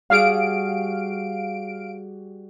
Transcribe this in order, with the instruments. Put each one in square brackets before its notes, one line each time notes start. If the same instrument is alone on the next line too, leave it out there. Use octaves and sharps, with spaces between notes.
[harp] G3 F#4 G#4 [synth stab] F5 D7